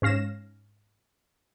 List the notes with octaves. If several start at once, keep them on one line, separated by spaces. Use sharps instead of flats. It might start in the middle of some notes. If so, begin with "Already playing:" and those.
G#2 C#4 F5 A#6 E7